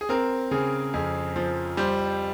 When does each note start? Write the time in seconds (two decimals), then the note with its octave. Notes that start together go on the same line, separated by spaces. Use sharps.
0.01 G#4
0.09 C4 A#4
0.51 C#3 G#4
0.94 F2 G#4
1.36 F3
1.77 G3 C5